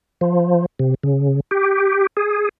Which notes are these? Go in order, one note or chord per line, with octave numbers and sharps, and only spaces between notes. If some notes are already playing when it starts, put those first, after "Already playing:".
F3
C3
C#3
G4
G#4